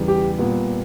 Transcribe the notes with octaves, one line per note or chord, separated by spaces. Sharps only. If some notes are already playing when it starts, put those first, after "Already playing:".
Already playing: E2 C#3 E3 G3
G4
A#2 G3 B3